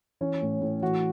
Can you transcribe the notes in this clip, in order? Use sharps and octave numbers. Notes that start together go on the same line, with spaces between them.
E3 C#4
A2
A2
E3 F#4